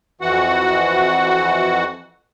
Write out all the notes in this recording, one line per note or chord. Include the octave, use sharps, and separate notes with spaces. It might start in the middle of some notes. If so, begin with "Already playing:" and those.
F2 E3 F#4 F#5